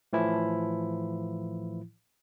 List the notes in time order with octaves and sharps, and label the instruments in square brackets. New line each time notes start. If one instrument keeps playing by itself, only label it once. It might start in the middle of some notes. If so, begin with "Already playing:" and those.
[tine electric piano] A2 E3 F3 E4